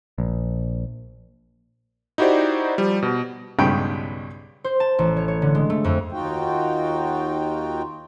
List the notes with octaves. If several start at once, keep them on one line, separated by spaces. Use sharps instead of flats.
A#1
D#4 E4 F#4 G4 C5 D5
F3 G3
B2
B1 G2 C#3 G#3 G5 B5
C5
A5
A1
C#5
C#5
D3
G#3
A3
F2
D#2 D#4 F4 F#4 G5